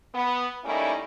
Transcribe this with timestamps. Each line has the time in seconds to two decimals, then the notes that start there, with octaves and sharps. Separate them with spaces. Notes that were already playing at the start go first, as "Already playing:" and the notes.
0.14 B3
0.63 G3 A3 A#3 C#4 D#4 E4